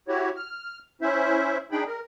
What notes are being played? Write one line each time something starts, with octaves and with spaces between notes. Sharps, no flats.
E4 F#4 G4 C#5
F6
C#4 E4 C5 E5
D4 D#4 G#4 G5 B5
A#4